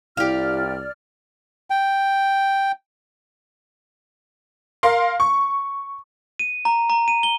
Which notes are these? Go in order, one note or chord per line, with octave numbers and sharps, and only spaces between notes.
C2 E4 G4 D5 F5 F6
G5
A#4 F5 C6
C#6
D#7
A#5
A#5
D#7
G7